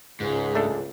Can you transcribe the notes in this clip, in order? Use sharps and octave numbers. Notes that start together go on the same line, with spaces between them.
C#2 G#2 G#4
A3 D4 A4